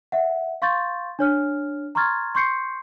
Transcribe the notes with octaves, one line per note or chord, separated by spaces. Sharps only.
E5 F#5
F5 C6 C#6 G6 A6
D4 C#5 F6
A#5 C6 C#6 F6 G#6 A6
C6 C#6 G6 C7 C#7